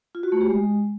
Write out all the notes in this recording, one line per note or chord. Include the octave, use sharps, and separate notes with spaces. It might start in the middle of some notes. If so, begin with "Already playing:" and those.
F4
F#4
A3
G4
G#3